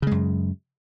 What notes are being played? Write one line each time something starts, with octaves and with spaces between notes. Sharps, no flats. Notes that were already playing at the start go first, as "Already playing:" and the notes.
F#2 C#3 G#3